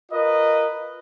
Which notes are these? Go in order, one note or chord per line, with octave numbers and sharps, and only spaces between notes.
F4 A#4 B4 D#5